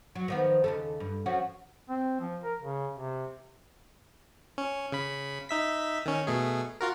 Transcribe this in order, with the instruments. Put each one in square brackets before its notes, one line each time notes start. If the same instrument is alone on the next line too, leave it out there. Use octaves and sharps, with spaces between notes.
[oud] F#3
D#3 F3 B3
D#2 C#3 A4
G2
F3 C#4 F#4
[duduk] C4
F3
A#4
C#3
C3
[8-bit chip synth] C#4
C#3 B5
D#4 E5 B6
D#3 C#4
B2 A3 G#4
F4 F#4 A#4